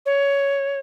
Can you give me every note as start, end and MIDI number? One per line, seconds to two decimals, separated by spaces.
0.06 0.79 73